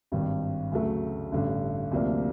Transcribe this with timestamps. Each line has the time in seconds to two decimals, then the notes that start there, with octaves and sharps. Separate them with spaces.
0.12 G#1 G2 D#3
0.72 D2 C#3 F#3 A3
1.32 A1 G2 D3
1.92 D2 C3 F3 A#3 D4